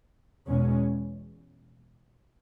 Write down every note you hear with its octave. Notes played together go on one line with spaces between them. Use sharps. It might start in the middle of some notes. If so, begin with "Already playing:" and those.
E2 B2 G#3 C#4